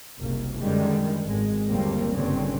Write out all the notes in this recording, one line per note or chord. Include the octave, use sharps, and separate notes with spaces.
F#1 C2 A#3
F#2 D3 D#3 G3 G#3
G#1 G#3
G1 D#2 G3 A#3 C4
F#1 G2 A#2 D3 C4 C#4